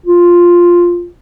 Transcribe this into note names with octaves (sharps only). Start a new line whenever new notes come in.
F4